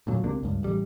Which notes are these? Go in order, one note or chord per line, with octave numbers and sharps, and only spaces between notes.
D2 A#2 F#3
C#2 C3 A#3 D4
C#2 G2
A1 G3